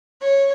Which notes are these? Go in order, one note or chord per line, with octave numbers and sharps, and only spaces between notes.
C#5